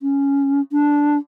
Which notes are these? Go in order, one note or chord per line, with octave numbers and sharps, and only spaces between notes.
C#4
D4